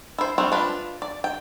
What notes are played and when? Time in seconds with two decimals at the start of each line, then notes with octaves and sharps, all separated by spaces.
0.18 E4 C5
0.38 G3 C4 F#4
0.52 D4 F4 B4
1.02 D5
1.24 G5